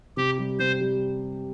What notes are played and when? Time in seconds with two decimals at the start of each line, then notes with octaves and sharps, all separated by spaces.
0.17 C3 G4
0.38 G3
0.59 C3 C5
0.81 G3